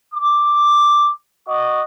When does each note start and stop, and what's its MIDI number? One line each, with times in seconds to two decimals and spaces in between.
0.14 1.11 86
1.48 1.83 66
1.48 1.83 75
1.48 1.83 85
1.48 1.83 86